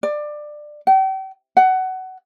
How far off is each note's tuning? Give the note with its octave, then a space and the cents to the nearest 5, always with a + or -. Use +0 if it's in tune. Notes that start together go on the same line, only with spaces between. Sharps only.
D5 +20
G5 -40
F#5 +20